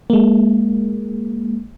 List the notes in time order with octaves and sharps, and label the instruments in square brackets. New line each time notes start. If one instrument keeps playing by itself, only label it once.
[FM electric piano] G#3 A#3